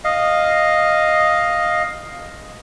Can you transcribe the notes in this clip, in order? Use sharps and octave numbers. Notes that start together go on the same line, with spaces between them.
D#5 F5